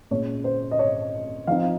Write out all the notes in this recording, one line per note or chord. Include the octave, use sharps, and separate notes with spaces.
A#2 G#3 C#4 C#5
C5
D#5
C#5
F3 C4 D#4 F5